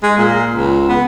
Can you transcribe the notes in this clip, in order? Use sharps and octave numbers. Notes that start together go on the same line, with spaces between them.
G#3
A#2
C#2
B3